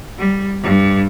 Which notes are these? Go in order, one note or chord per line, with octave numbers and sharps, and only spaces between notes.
G3
G2